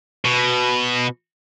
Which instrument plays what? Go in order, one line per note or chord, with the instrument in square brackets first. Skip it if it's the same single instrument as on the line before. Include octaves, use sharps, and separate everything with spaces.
[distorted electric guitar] B2